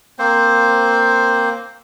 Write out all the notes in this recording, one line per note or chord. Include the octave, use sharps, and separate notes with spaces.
A#3 C4 C5